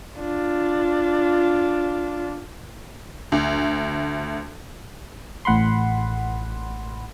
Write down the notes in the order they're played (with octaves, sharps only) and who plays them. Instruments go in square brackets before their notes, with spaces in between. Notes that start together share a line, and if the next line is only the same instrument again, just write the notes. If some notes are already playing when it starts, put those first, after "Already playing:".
[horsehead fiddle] D4 F4
[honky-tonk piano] D2
[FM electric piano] A1 A2 F#5 B5 C6